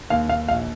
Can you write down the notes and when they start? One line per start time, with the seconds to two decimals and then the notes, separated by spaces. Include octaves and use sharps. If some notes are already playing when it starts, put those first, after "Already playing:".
0.10 D#2 F5
0.29 D#2 F5
0.48 A#1 F5